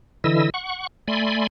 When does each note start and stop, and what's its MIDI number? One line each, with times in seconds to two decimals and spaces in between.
0.24 0.50 50
0.24 0.50 52
0.24 0.50 64
0.24 0.50 75
0.24 0.50 88
0.54 0.87 78
0.54 0.87 85
1.08 1.47 57
1.08 1.47 74
1.08 1.47 80
1.08 1.47 83
1.08 1.47 84